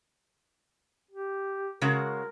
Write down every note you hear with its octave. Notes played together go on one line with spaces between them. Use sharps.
G4
C#3 G#3 F#4 A#4